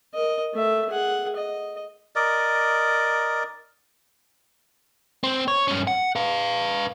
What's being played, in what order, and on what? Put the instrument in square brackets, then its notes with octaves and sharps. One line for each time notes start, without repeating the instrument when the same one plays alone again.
[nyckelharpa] A#4 D#5
A3 E5
G#4 F#5
D#5
[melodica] A#4 D5 D#5
[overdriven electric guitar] C4
C#5
G2 C#4
F#5
B4 F5